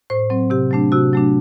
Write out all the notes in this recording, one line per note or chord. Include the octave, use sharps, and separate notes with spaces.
A2 C5
F#3 C4
C3 G4
F#3 A3 D4
C3 F#4
F#3 A3 D4